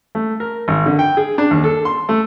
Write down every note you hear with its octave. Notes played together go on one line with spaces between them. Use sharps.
A3
A#4
G#1
D3
G5
G#4
D4
D#2
A4
C6
A3